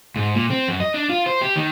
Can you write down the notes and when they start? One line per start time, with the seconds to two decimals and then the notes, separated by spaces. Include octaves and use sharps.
0.16 G#2
0.35 A#2
0.51 C4
0.68 F#2
0.80 D#5
0.94 D4
1.09 F4
1.26 C5
1.41 G4
1.56 D#3